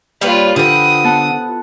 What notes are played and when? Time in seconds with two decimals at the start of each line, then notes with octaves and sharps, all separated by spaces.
0.21 G3 A#3 F4 B4 C#5
0.56 D3 F3 F4 G4 B4 D#6
1.04 B3 F#5 A5